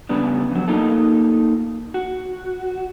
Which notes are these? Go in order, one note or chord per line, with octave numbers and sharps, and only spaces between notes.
C#3 G3 B3 D4
F2 F#3
A#3 D#4 F4 A4
F#4